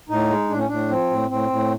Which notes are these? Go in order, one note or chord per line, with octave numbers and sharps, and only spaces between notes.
A2 D#4
G#3
A2 D4
C#4
A2 D4
F3 C4
A2
A2 C4
A2